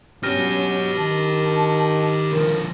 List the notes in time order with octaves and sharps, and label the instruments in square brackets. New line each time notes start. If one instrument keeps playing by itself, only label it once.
[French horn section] B2 F#3 [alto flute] C#4 [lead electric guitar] G4 B4 [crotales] F6 A#6 D#7
[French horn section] D#3 [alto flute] A5
[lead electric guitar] D3 F3 [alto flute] A#4